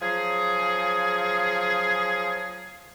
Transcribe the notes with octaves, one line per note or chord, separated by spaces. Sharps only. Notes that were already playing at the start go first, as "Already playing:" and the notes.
F3 F#3 G#4